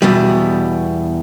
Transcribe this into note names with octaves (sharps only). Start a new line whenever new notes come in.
E2 B2 G3